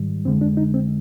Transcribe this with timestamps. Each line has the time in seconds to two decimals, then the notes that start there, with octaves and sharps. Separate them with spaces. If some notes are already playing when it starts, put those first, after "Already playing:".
Already playing: G#2 D#3 G3
0.25 F2 D3 G#3 C4
0.41 D4
0.57 D#4
0.74 C4